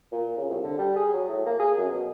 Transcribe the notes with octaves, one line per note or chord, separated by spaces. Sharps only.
A#2
C#3
C2
D3
G3
G#4
F#3
A2
A#3
G#4
F#2
B2